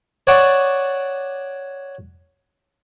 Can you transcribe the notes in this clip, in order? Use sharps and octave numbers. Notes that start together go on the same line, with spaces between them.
C#5 D5 F#5 A5 D6 D#6